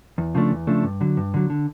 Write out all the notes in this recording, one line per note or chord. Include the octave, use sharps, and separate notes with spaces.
E2
C#3 F3 A3 D4
E2
C#3 F3 A3 D4
G2
D3 F#3
G2
D3 F#3
D3